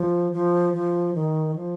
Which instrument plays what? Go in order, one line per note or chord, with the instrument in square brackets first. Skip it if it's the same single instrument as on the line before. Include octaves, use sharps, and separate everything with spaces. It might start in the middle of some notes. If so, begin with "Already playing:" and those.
Already playing: [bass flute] F3
F3
F3
D#3
F3